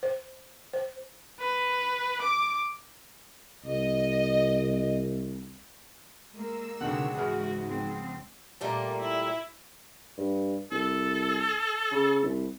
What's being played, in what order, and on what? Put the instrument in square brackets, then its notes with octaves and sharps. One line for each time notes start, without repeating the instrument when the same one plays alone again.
[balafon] C5
C5
[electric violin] B4
D6
[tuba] C2 [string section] D#5
[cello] G#3 A#3 [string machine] E6
[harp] C#2 F#5 [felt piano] B2 D3 D#3 [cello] C4 C#5
[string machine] G#2 [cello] E3 F#4 [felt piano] G#4 B4 F6
[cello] F3 C4
[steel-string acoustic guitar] A#2 G3 A3 [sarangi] A#3
[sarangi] E4
[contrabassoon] G2
[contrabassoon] C2 [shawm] A4
[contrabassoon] C#3
C2